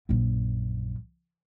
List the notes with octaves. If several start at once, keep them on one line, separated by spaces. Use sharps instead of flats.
A#1 F#2